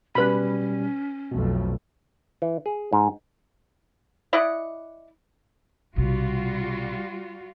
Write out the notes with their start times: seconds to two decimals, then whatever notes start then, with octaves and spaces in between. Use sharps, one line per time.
0.15 B2 G3 C#4 B4 B5
1.32 B1 F2 B2 A3
2.42 E3
2.66 G#4
2.93 G#2
4.33 E4 D5 D#5 F#5
5.96 B1 C3 G3 F4 F#4